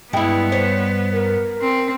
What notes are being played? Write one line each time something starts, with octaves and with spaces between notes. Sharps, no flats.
G2 G3 G#3 B3 E4 G5
C5 C#5
A#4
C4